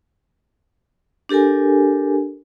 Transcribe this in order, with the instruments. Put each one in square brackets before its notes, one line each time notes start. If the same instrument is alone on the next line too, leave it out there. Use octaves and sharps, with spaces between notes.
[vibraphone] D4 G4 A4 A#4 G#5